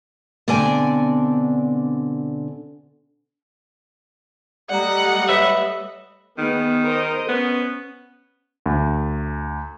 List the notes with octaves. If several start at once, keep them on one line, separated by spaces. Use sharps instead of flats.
B2 D3 C4 D4 D5 G#5
G3 A3 D5 D#5 F#5 A#5
B4 C#5 E5
D#3 B3 G#4
A#4 C5 D#5
B3 C#4
D2